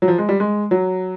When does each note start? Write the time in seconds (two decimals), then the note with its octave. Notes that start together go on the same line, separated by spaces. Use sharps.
0.02 F#3
0.08 F3
0.18 G#3
0.29 G3
0.40 G#3
0.71 F#3